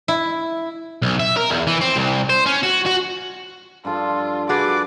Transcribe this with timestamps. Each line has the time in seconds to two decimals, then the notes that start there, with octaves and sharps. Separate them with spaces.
0.08 E4
1.02 B1
1.20 E5
1.37 A#4
1.51 E2
1.67 E3
1.81 C4
1.96 C2
2.29 C5
2.46 C#4
2.63 F#4
2.86 F#4
3.85 G2 F3 F4 A4
4.49 F#4 G#4 B4 D5 D6